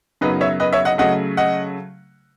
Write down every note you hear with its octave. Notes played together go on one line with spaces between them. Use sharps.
F#2 C#3 F#3 B3 D#4 B4 D#5
C#5 E5
B4 D#5
C#5 E5
D#5 F#5
C#3 F#3 A3 D#5 F#5
D#5 F#5